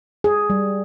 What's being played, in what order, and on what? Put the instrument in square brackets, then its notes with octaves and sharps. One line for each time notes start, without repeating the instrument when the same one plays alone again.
[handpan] G#4
G3